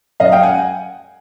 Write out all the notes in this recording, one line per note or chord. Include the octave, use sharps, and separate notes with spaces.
F#2 D#5 F5
F5 G5
F#5 G#5